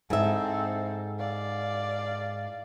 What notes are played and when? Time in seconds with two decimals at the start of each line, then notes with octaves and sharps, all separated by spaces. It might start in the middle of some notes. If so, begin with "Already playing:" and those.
0.10 G#2 C4 A4 E5
1.19 D5 F5